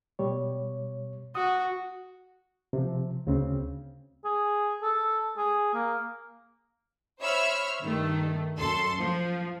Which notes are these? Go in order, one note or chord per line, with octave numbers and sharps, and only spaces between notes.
B2 G3 C#5
F#4 D#6
C3 F3
D2 C#3 C4
G#4
A4
G#4
A#3
C5 C#5 E5 B5 E6 F6
G2 D#3 A3
F#2 A4 C6
F3